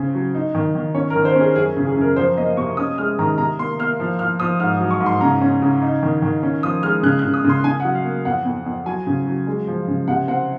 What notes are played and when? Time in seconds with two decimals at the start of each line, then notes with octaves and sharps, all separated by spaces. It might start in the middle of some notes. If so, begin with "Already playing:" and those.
Already playing: C#3 C4
0.14 F#3
0.35 D#4
0.55 D#3
0.75 D#3
0.95 C#4 C#5
1.10 A#4
1.16 D#3
1.25 C5
1.36 C#4 G#4
1.56 F#2 G#4
1.77 C#3
1.86 G#4
1.96 F#2 A#4
2.16 F3 C5
2.37 A#3 D#5
2.57 C3 C#6
2.77 C#4 D#6
2.98 G#3 F6
3.19 D#3 A#5
3.38 C3 A#5
3.59 A#3 C6
3.79 A#3 F6
4.00 F3
4.19 F3 F6
4.40 F3 D#6
4.60 G#2 F6
4.80 F#3
4.90 C#6
5.00 G#2
5.06 C6
5.21 C#3 A#5
5.42 C#4
5.62 C#3
5.82 D#4
6.03 D#3
6.22 D#3
6.43 C#4
6.63 F3 D#6
6.83 G#3 F6
7.03 C#3 F#6
7.19 F#6
7.24 C#3
7.34 D#6
7.45 C#3 C6
7.64 C#3 G#5
7.80 F#5
7.84 F#3
7.95 F5
8.05 A#3
8.25 F2 F#5
8.45 F2
8.66 F2
8.86 F#3 G#5
9.07 C#3
9.26 F#3
9.47 G#3
9.67 F3
9.88 C#3
10.08 C3 F#5
10.28 C4 F#5